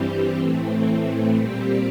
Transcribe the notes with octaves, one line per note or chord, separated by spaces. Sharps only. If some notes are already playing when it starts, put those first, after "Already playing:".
Already playing: G2 E3 G3 C4 G4
A2 E3 A3 C4
A#2 G3 C4 G4